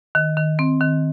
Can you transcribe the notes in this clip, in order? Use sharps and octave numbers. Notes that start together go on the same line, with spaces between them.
D#3
D#3
C4
D#3